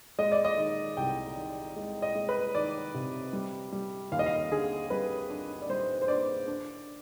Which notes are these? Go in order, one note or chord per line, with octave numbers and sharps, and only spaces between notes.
G#3 D#5
D5
D#5
D#3
C2 G5
D#3
G#3
D#5
G#3
B4
D#3 D5
C3
G3
G3
D#2 F5
D#5
F5
D3 G#4
G3 B4
D4
D5
G3 C5
C5
D4 D5
D4